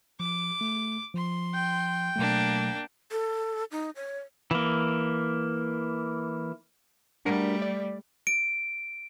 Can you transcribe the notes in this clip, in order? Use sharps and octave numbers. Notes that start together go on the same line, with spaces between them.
F3 D6
A3
F3 C6
G5
B2 F#3 A3 A#3 D4
A4
D#4
C#5
E3 A#3
G3 A3 D4 F#4 A#4
D5
D7